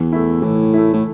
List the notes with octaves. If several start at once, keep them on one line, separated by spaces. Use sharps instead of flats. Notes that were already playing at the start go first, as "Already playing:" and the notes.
Already playing: E2 E3
A3 E4
A2 E3
A3 E4
A2